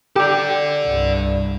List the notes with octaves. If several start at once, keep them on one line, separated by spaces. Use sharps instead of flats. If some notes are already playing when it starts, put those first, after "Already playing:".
G4 A4 D5
C2 G2